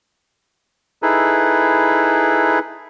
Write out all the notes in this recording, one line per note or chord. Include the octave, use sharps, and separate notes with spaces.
D#4 E4 G#4 A4 B4